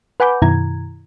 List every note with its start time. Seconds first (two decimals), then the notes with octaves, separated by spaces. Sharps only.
0.20 B4 F#5 G#5 B5 D6 G6
0.42 F#2 B2 D#3 E4 A#5 G#6